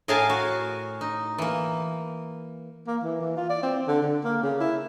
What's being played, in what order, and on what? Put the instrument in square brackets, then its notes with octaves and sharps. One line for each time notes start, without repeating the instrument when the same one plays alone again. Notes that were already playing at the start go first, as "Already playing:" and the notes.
[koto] A2 G#4 A#4 F5 G#5 A5
F#4
D#4
E3 A#3
[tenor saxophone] A#3
E3
E3
F4
D5
C4
D3
D3
A#3
C#3
E4